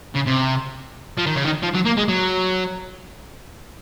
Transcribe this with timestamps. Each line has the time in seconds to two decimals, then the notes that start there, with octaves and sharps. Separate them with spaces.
0.15 C#3
0.27 C3
1.18 F3
1.26 D#3
1.36 C#3
1.45 D#3
1.63 F3
1.75 F#3
1.86 A#3
1.98 G#3
2.08 F#3